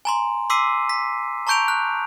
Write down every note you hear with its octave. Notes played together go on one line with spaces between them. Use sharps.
G#5 A#5 C6
C6 D6 E6 B6 C7 D#7
B6
A5 A#5 C#6 G6 D7 F7
F#6